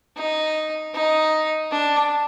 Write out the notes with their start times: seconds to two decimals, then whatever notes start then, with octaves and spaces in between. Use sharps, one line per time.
0.17 D#4
0.94 D#4
1.71 D4